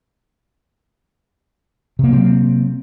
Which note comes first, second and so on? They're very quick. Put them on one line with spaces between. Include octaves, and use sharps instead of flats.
C3 A#3 F#3 C4